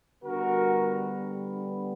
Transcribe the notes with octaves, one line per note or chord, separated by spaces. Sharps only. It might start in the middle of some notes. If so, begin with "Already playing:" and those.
D3 G3 B3 F#4 A#4